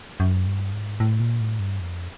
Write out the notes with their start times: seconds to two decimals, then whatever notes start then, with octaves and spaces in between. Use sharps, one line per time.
0.20 F#2
0.47 G2
0.73 G#2
1.00 A2
1.20 A#2
1.40 A2
1.59 G2
1.80 F2